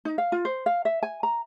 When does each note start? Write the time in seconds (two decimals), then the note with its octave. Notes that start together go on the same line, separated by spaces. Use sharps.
0.05 D#4
0.18 F5
0.32 F4
0.45 C5
0.66 F5
0.85 E5
1.03 G#5
1.23 A#5